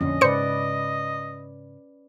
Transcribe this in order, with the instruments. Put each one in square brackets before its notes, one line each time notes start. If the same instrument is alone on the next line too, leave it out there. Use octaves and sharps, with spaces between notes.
[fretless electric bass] A#1 F2 D3 [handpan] C#4 [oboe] D#5
[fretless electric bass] G#2 C#3 [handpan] B4 D5 [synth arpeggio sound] C5 C#7